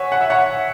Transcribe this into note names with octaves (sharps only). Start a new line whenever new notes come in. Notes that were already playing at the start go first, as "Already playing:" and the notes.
Already playing: C#5 E5 F#5 G#5
F#5
E5
C#5 F#5